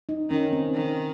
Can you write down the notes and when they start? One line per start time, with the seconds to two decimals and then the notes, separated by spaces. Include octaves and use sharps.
0.09 D#4
0.30 D#3 C#4
0.53 C4
0.75 D#3